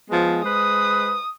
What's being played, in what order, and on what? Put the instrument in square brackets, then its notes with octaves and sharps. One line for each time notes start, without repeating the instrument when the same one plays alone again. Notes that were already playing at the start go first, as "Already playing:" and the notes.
[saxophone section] F3 G#3 B3
[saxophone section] G#3 B4 C5 [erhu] D#6